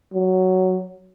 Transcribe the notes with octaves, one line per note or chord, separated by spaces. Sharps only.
F#3